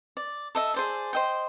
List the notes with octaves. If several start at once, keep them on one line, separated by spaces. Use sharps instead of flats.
D5
A4 D#5 E5
G#4 C5 D5
C5 D#5 G5